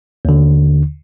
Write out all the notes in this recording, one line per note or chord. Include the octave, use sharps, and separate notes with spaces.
D#2 D3